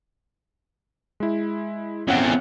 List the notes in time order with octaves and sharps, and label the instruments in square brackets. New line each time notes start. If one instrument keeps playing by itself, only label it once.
[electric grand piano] G#3 E4
[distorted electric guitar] E2 C4 [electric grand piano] C#4 F5 F#5